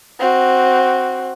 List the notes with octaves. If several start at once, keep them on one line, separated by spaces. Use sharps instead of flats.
C4 F#4